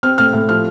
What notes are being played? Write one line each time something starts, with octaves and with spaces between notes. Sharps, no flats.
C4 F6
A2 F6
A2
F3 F6